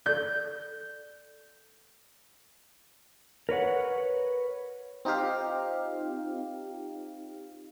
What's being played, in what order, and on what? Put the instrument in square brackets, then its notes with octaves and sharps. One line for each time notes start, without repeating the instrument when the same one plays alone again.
[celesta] A4 D5 [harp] G6
[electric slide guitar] A#4 B4 C#5 F#5
[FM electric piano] C4 D#4 F4 G4 F5